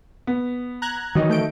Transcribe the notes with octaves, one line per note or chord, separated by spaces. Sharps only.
B3
A#5 F#6 G#6
D#3 E3 F#3 D#4
A3 G6 D7